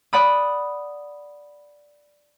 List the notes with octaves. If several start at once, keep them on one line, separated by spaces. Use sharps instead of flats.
D5 F#5 B5 D#6